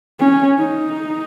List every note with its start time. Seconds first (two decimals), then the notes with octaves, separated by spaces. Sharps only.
0.19 C#4
0.59 D#4